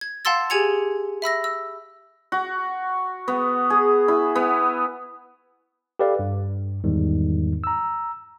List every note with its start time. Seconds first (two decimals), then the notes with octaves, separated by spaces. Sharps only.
0.01 G#6
0.25 F5 F#5 A5 C6 E6 A6
0.50 G4 G#4 G#5 G#6 C#7 F7
1.22 E5 B5 E6 A#6
1.44 E6
2.32 F#4
3.28 B3
3.70 G#4
4.08 E4
4.35 B3
5.99 G4 A4 B4 D5 F5
6.19 G2
6.84 E2 G#2 D#3 G3
7.64 A#5 E6